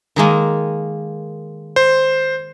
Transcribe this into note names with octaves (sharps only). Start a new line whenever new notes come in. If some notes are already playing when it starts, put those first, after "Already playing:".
D#3 G#3 A#3
C5